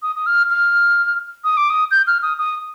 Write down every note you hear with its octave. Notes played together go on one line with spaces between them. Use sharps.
D#6
D#6
F6
F6
D#6
D6
D#6
G6
F6
D#6
D#6